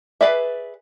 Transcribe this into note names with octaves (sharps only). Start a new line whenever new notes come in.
G#4 B4 D5 E5